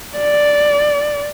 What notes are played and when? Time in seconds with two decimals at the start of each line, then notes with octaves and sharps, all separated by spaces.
0.18 D5